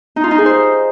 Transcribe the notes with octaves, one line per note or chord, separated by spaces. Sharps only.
D#4
F4
D#4
G#4
C5